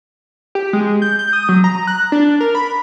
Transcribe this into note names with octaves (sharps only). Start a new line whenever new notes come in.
G4
G#3
G6
G6
D#6
F#3
A#5
F#6
D4
A#4
B5